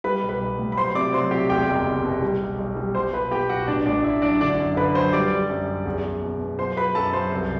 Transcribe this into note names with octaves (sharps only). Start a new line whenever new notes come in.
G3 B4 B5
B1
B4 B5
B1
A2
B5
F#3 C5 C6
C3 D5 D6
F#3 C5 C6
C3 G4 G5
E2 G4 G5
F#1
F#1
B2
G3
B1
B1
G3
B2 C5 C6
B1 B4 B5
B2 G4 G5
B1 F#4 F#5
A1 D4 D5
A1 D4 D5
A1 E4 E5
F#3 D4 D5
D3 D4 D5
F#2
D3 B4 B5
F#3 C5 C6
G3 D5 D6
G3
F#2
F#2
E2
E2
B2
B2
F#3 C5 C6
F#3 B4 B5
F#2 A4 A5
F#3 C5 C6
C2